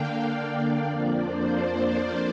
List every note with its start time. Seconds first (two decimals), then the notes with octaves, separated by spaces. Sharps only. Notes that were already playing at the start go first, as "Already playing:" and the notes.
Already playing: D3 A#3 D4 F5 G5
0.18 D5
0.85 F2 F3 A#3 D4 D5
1.20 C5
1.54 D5